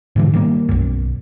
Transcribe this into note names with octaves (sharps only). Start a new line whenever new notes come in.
G#2 D3 E3
D#3 G3 A#3
B1 F#2